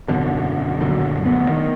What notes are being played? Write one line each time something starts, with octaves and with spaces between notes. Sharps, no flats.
G#1 F#2 B2 D3
F#2 A#2 D3 F#3
D2 B3
D#3